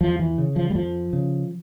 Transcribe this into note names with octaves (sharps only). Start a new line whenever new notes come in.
E2 F3
E3
C#3
F3
G3
F2 F3
C#3